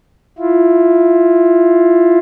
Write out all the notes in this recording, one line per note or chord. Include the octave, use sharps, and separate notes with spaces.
E4 F4